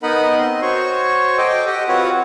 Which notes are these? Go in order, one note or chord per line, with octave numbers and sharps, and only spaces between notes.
B3 D#4 A#4 D#5 F#5 B5
C4 D#5 C6
F#4 C5 C#5 C#6
A4 C5 D#5 G5 D6
G4 D#5 F#5 G5
C4 F4 F#4 B4 C#5 F#5